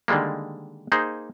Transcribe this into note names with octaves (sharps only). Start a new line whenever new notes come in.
D3 D#3 G3 G#3 A#3
A#3 D#4 G#4 C5